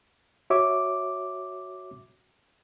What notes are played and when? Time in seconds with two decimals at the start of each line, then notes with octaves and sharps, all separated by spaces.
0.50 F#4 C#5 E5 D6